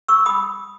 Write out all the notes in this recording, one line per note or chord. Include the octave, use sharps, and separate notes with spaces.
C#6 E6
B5 D#6